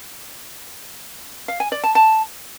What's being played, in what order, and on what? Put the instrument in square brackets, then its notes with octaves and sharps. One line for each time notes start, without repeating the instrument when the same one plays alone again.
[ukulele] F5
G#5
D5
A5
A5